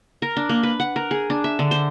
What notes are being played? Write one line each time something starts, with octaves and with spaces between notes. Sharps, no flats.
A#4
D4
A#3
B4
F#5
A#4
G#4
D4
E5
D3
C5